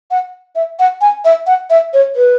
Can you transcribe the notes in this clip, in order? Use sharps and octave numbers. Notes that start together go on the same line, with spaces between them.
F#5
E5
F#5
G#5
E5
F#5
E5
C#5
B4